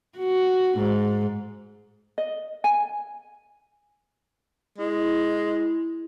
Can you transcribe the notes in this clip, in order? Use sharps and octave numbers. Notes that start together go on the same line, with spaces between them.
F#4
G#2
D#5
G#5
G#3 E4